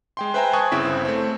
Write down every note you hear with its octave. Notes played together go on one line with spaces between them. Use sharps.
G#3 G5 C6
B4 C5 E5 G5 G#5 A#5
G#5 A5 C#6 D#6 F#6 G#6
G1 C#3 C4 E4 B6
A3 C4